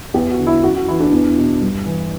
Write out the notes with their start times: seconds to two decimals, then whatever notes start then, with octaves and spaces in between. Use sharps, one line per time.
0.14 E2 G4
0.31 F#4
0.39 D3
0.47 E4
0.63 F#2 F#4
0.76 F#4
0.88 E3 E4
1.00 D4
1.13 E2
1.37 B2
1.61 G2
1.86 E3